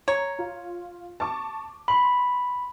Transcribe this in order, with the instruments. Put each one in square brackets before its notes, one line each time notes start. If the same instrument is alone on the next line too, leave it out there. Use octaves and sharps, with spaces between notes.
[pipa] C#5 [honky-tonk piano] A#5
[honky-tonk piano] F4
A5 C#6 D6
[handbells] B5 [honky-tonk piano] C6 F#7